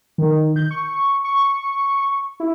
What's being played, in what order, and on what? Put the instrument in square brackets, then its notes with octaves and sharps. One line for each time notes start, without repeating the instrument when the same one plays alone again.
[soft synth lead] D#3
G6
C#6
C#6
E4